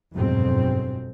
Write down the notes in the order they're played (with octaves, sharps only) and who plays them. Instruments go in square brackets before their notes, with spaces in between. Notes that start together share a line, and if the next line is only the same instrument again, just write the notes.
[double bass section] G1 F2 G#2 B2 F#3 C4